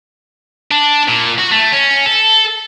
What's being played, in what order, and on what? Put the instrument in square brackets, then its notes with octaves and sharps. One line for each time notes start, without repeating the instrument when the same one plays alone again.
[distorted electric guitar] D4
A#2
F#4
A3
C#4
A4